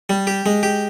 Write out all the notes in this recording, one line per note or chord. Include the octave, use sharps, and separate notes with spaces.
G3
G4
G#3
G4